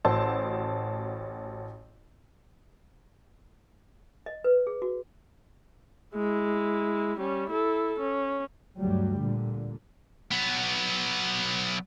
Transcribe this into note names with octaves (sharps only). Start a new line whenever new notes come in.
A1 F#4 C5 A5 E6
D#5
B4
G#4
F#4
G#3 E4
G3 C#4
E4 A4
C#4
D2 G2 F#3 G3
A#2 D3
F#3 B3